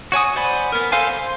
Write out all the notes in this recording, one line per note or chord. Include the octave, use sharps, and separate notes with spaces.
F#4 C#5 G#5 D#6
C5 D5 F#5 G#5 B5
B3 A#4
A4 A#4 C5 F5 G#5
C5